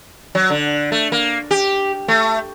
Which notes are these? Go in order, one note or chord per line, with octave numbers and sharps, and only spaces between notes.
F#3
D3
A3
A#3
G4
A3